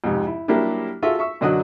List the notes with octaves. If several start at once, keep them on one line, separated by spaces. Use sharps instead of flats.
F2 G#2 C3
E4
F#3 G3 A#3 D4 E4 G4
F4 F#4 G#4 A4 E5
E5 C#6 E6
F#2 D3 F#3 D#5 D#6 F#6